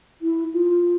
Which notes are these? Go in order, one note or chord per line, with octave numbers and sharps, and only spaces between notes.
E4
F4